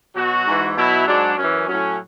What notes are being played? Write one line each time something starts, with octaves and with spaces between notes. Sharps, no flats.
B2 F#3 F#4
G#2 E3
B2 F#3 E4
G#2 F#3 D4
F#2 E3 C#4
A2 F#3 C#4